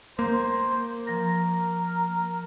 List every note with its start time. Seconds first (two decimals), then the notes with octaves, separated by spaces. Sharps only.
0.19 A#3 C5
1.07 F3 A#4 A#6